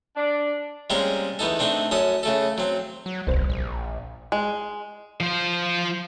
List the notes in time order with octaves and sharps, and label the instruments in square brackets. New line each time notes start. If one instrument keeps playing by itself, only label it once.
[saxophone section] D4
[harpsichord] G3 G#3 A#3 C4 C#4 A#4
E2 B3 D#4 A4
A3 C4 D4 D#4
F#2 C#4 A4 D#6
C#3 A3 A4
F#3 C4
[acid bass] F#3
[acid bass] D#1 [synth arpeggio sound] C2 C5
[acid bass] A#1
[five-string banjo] G#3
[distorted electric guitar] F3 C5